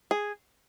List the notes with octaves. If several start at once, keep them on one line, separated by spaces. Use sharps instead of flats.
G#4